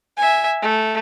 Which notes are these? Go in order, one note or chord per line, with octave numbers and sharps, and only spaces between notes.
E5 G#5
A3